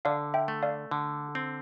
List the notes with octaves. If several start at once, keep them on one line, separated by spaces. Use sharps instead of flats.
D3 D5 F5
E5 G5
A3
D5 F5
D3
C4